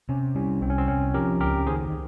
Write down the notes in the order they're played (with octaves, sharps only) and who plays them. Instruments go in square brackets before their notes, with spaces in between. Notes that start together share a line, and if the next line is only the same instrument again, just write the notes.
[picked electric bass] C3 [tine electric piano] C#4
[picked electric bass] G3 [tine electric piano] C#4
[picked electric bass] C2 [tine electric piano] C4
[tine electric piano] C#4
C4
[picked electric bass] C3 [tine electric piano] C#4
[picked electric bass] F3 [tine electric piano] G4 A#4
[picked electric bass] C#2 [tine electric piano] G4 A#4
[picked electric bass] D#3 [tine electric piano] G#4 C5